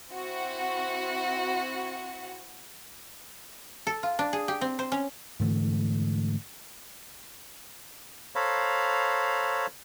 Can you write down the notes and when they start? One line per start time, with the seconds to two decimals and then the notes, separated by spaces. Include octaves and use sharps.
0.10 C4 E4 F#4 F#5
3.87 A4
4.03 F4
4.19 D4
4.33 G#4
4.48 G4
4.61 C4
4.79 C5
4.92 C#4
5.40 G#2 D3 E3 A3
8.35 A4 C5 C#5 F5 A#5 B5